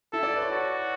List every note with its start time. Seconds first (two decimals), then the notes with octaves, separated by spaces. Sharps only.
0.13 E4 A4
0.23 D5
0.36 B4
0.42 C#5
0.51 F#4